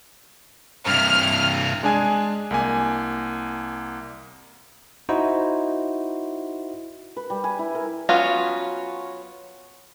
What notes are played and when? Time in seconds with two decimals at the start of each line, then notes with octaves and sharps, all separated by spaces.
0.87 G2 C3 F6
1.83 G#3 D4 G#4 G#5
2.51 C2 A#3 G#5
5.09 D#4 E4 F#4 C5
7.17 B4
7.30 G3
7.44 G#5
7.59 E4
7.75 A#4
8.09 F#3 B3 C#4 F4